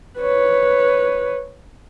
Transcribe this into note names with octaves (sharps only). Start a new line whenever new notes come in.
B4 C#5